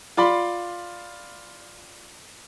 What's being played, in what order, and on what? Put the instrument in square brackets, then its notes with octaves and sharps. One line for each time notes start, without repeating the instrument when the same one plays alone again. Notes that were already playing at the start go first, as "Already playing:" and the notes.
[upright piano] F4 D5 B5 C6